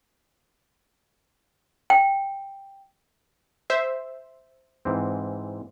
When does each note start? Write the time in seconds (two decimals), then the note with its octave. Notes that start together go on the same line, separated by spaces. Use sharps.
1.90 G5
3.70 C5 E5
4.85 G#2 E3 C4